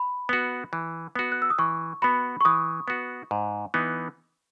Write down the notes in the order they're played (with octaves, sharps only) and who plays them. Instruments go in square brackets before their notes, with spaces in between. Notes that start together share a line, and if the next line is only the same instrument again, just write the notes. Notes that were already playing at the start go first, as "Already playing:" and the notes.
Already playing: [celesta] B5
[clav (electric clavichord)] B3 F#4
E3
B3 F#4
[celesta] F#6
E6
D#6
[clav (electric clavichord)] E3 [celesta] C#6
[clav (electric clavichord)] B3 F#4 [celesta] B5
[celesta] C#6
[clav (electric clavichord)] E3 [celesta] D#6
[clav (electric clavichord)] B3 F#4
G#2
E3 B3 D#4